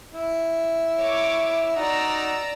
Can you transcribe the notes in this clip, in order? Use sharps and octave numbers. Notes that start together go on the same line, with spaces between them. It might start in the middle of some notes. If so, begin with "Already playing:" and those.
E4
C#5 D6
D#4 F#4 D5 F#5 A#5 E6